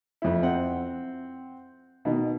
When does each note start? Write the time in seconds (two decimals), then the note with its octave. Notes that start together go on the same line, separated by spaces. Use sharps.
0.22 F2 E4
0.43 C4 F#5
2.05 B2 D#3